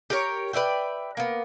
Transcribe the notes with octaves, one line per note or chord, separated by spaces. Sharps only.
G4 A#4 C#5
B4 D5 E5 G5
A#3 B3